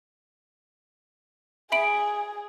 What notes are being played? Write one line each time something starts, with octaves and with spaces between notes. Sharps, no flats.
G#4 E5 B5 D7